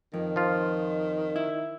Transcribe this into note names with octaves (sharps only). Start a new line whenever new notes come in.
F2 D#3
F3 F4
E4